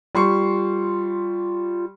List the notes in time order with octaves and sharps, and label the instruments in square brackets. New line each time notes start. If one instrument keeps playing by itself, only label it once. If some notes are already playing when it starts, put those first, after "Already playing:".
[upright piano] G3 C6 C#6 [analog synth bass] F4